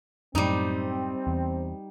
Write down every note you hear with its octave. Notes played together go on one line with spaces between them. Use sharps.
F#2 A2 G3 C4 D#4
E2